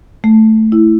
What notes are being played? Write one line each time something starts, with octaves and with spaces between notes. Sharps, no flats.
A3
E4